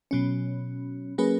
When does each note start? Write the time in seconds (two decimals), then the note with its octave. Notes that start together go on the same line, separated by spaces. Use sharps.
0.11 B2 F#3 C#4
1.18 F#3 A#3 C#4 G#4 B4